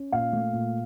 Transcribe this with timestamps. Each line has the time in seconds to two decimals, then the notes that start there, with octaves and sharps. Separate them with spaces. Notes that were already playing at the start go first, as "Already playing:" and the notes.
Already playing: C#4
0.12 A#2 F5
0.33 A3
0.53 A#2